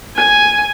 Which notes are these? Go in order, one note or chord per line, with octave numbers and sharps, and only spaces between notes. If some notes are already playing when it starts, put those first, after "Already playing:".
G#5